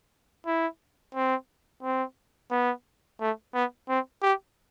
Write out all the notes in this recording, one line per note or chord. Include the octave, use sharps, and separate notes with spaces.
E4
C4
C4
B3
A3
B3
C4
G4